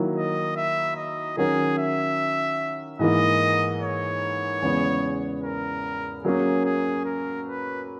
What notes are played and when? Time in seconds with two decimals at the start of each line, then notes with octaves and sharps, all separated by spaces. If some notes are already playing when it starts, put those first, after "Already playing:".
Already playing: D#3 F#3 A#3 E4
0.16 D#5
0.56 E5
0.96 D#5
1.37 D#3 F#3 C#4 F#4 G#4 A#4
1.78 E5
2.99 G#2 E3 A#3 D#5
3.81 C#5
4.62 E2 C#3 G#3 B3
5.43 A#4
6.24 F#3 A#3 C#4 G#4
6.65 G#4
7.05 A#4
7.47 B4